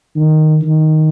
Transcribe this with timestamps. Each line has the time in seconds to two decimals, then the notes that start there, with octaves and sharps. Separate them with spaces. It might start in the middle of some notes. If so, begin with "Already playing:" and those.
0.16 D#3
0.62 D#3